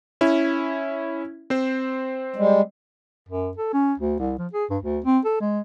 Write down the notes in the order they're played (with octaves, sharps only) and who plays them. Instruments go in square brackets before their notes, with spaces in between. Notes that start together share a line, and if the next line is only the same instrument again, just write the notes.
[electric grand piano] C#4 E4
C4 C5
[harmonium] G3 G#3
[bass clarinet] F#2
A4
C#4
D2
C2
F3
G#4
G2
D2
C4
A4
G#3